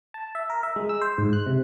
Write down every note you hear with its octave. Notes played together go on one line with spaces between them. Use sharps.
A5
E5
A#4
E5
G#3
E6
C5
G#2
F#6
C3